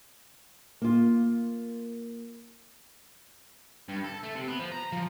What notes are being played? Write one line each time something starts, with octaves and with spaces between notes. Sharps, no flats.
A#3 F4
G2
A4
A3
C3
B3
F3
A#5
F3